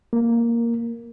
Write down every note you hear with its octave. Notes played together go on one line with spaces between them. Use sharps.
A#3